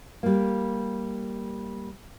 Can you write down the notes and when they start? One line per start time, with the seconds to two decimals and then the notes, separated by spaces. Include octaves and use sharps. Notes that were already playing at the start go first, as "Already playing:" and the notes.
0.23 G3 A#3